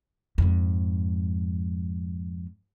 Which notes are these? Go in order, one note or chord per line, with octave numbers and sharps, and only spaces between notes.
F2 G#2